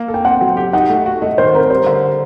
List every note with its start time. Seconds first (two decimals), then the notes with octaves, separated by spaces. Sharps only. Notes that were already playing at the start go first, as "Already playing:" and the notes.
Already playing: A#3
0.08 A4
0.14 G5
0.25 C4 F#5
0.41 F#3
0.57 G4
0.73 D#4 F#5
0.90 A3
1.06 F#4
1.22 A3 D#5
1.38 D#3 C5
1.54 C4 A#4
1.70 G3 C5
1.86 D3